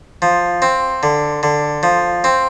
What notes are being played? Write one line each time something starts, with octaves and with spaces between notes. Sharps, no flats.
F3
C4
D3
D3
F3
C4